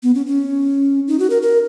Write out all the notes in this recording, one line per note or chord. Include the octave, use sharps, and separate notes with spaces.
B3
C#4
C#4
D#4
F#4
A#4
A#4